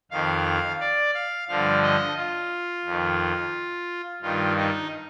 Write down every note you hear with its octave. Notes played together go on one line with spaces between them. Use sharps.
F2 D#3 F5
D5
F5
G2 D3 F3 F5
D#5
F4
F2 D#3
G2 D#3 F4
D#4